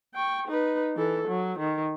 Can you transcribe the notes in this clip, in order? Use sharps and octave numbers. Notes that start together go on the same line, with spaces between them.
G5 C#6
D#4 B4
E3 A4
F#3
D#3